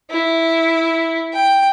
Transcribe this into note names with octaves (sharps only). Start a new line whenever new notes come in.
E4
G5